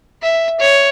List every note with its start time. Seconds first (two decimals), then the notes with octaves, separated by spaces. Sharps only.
0.23 E5
0.60 C#5